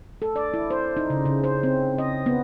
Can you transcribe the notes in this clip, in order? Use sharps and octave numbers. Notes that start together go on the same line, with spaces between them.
A4
D5
E4
C5
D#4
C#3
C#3
C5
C4
D#5
B3